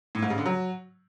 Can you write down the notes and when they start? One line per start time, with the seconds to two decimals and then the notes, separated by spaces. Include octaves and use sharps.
0.15 A2
0.23 G#2
0.30 C#3
0.38 D3
0.46 F#3